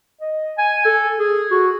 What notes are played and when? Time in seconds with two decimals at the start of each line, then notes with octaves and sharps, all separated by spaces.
0.21 D#5
0.58 G#5
0.85 A4
1.19 G#4
1.51 F#4